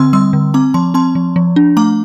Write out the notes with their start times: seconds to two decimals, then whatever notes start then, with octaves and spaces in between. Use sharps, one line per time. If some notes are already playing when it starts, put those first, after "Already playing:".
Already playing: D3 C4 C6 E6
0.13 G3 C6 E6
0.33 D3
0.54 C4 A#5 D6
0.74 F3 A5 C6
0.94 C4 A5 C6
1.15 F3
1.36 F3
1.56 D4
1.77 A3 A#5 D6